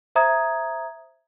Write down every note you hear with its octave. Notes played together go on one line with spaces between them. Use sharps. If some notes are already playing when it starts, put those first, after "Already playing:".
C5 E5 A#5 D#6 G#6